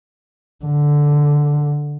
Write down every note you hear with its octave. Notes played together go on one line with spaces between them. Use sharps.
D3